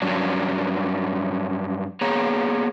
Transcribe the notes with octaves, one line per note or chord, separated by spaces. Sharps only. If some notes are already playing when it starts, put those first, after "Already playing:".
G2 F#3 C#4 D4
A#3 B3 G#4 C#5 A#5